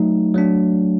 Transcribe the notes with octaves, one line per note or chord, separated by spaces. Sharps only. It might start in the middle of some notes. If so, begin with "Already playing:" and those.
Already playing: F#3 A3 D#4
F#3 A3 D4